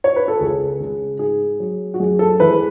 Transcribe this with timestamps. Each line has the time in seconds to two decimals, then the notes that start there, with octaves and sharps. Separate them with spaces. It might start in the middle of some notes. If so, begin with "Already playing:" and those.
0.04 C#5
0.16 B4
0.28 A4
0.39 C#2 G#4
0.80 C#3 G#3
1.19 G#2 G#4
1.60 F#3
1.94 F#4
2.00 F#2 G#4
2.19 A4
2.40 E3 G#3 B4